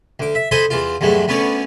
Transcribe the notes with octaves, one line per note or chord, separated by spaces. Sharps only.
D2 D6
E5
A4 C5 D#5 G#5 B5 C6
E2 E3 F4
E2 G2 F#3 G#3 A3
D2 B3 C#4 C#5 D5